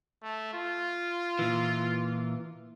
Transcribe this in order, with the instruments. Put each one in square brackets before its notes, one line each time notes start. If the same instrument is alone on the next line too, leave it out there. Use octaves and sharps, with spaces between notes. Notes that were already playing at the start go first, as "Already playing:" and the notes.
[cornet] A3
F4
[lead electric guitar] A#2 E3